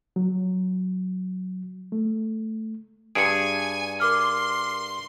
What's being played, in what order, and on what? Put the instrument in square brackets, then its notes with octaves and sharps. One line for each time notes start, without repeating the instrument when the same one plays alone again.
[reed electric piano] F#3
A3
[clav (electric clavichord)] G2 G#4 [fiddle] G#5 [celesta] C#7 D7
[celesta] A#4 D6 F6 [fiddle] C6